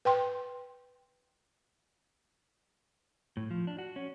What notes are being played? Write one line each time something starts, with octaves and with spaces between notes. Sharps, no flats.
B4 G5 C6
A2
F3
D4
F#4
C#4